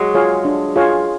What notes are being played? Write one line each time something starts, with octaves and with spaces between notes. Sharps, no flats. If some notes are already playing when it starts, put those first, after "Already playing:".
Already playing: F#3 G#3
F4 G#4 C#5 F5
D4
F4 G#4 C#5 F5